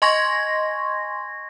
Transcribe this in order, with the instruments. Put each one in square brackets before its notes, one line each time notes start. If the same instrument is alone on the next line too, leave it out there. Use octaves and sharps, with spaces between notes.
[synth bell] D#5 G#5 C6 C#6 G#6 A#6